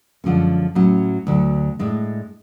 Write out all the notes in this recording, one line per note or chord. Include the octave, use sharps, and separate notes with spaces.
F#2 D3 F3 G#3 C#4
A2 F#3 C#4
D2 D3 F#3
A2 G#3 D4